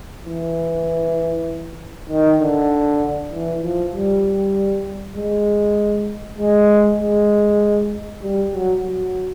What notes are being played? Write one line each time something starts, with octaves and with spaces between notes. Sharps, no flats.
E3
D#3
D3
E3
F3
G3
G#3
G#3
G#3
G3
F#3
F#3